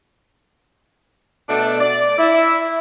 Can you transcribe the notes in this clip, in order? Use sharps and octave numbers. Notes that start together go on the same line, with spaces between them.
B2 A3 D4
D5
E4